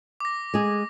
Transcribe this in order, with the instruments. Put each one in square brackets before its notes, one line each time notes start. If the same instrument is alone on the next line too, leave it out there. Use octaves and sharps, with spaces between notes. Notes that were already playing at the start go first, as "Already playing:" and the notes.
[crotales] D6 A#6
[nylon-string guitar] G#3 G#4